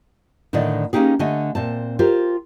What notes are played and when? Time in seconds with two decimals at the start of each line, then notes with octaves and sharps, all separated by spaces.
0.53 A2 D3 D#3 A3 D5 D#5
0.93 A#3 C#4 D#4 G4 G#4
1.19 D3 A3 D#5 G#5
1.55 A#2 C4 A5
1.99 F4 G4 A#4 C5